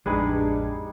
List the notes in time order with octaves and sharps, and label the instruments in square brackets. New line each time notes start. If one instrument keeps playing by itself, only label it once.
[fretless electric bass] A1 F2 [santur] G3 D#4 [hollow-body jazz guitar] G#3 G#4 B4 [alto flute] D4